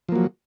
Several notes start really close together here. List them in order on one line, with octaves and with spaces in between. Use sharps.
F3 A#3 F#3